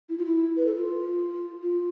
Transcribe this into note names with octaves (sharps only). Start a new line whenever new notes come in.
E4
F4
E4
B4
A4
F4
F4